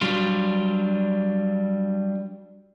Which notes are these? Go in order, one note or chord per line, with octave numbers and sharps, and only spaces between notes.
F#3 G3 D4 F4